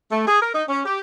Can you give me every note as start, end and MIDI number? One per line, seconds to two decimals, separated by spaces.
0.11 0.26 57
0.27 0.40 68
0.42 0.52 70
0.54 0.63 63
0.69 0.82 61
0.85 1.01 67